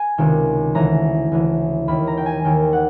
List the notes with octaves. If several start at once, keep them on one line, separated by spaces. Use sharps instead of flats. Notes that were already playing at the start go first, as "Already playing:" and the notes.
Already playing: G#5
C#2 C3 D#3
D2 C#3 E3 A#5
D2 C#3 E3
D#2 D#3 B5
A#5
G5
G#5
D#2 D#3 G5
F#5